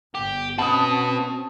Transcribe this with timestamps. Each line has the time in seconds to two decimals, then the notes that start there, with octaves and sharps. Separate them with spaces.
0.15 G1 G4
0.58 C4 C#4 F#4 B4 A5 D#6